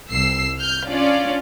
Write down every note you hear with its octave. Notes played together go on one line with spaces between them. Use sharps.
C2 E6 C7
F6 G6
C#4 D4 F4 D5